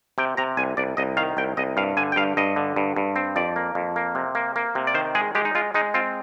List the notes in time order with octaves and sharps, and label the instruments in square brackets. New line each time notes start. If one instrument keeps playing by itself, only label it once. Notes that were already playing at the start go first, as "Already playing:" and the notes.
[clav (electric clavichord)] C3 G5
C3 A#5
C2 G#5
C2 D5
C2 D#5
D#3 F5
C2 G5
C2 D#5
G2 F5
D3 G#5
G5
G2 F5
G2 D#5
D3
G2
G2
C4
F2 D5
A#3
F2
A#3
C3
A#3
A#3
C3
D5
D#3 C5
G#3 G#4
G#3 G4
D#4
G#3 F4
G#3 D#4
C4 F4